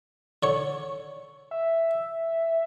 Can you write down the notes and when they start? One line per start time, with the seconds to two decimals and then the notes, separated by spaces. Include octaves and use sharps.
0.43 D3 C#5
1.51 E5